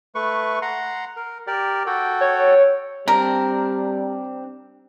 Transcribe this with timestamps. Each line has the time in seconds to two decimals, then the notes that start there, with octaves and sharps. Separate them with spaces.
0.15 A3 B4 C#6
0.62 F#5 A#5 C6
1.16 A#4
1.47 G4 A#4 D5
1.86 F#4 A4 G5
2.21 C#5
3.08 G3 C4 D4 A#4